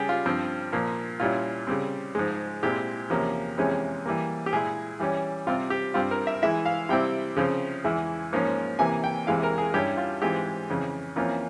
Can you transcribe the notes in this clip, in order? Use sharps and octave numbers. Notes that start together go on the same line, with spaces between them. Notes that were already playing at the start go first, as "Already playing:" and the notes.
Already playing: C#3 G3 C#4 G4 G#4
F4
G2 F3 C4
A#2 F3 A#3
A#2 G3 C#4 E4 F4
C#3 G3 C4
G#2 F3 G#3
A#2 G#3 C4 E4 G4
E2 C3 F3 A#3 C#4
F2 C3 E3 G#3 C#4
E3 G3 A#3
G4
A#2 G#3 E4 G#4
E3 G3 C#4
C3 G3 C4 F4
G4
G2 G3 C4 F4
A#4
E5
E3 G#3 E4 E5
F5
C3 G3 C4 E4 G5
C#3 F3 C4
E2 E3 G#3 E4
G#2 F3 A#3 C#4
C3 E3 A#3 G#5
G5
E2 C3 E3 G#3 E4 F5
A#4
G#4
G2 G3 C#4 E4 G4
F4
G#2 E3 G#3 C4 F4 G4
F2 C#3 E3
F2 E3 A#3 C#4 F4